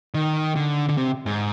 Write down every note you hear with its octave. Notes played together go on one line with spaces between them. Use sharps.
D#3
D3
D3
C3
G#2